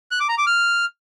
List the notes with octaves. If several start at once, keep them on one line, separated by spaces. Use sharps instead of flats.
F#6
D6
A#5
D6
F6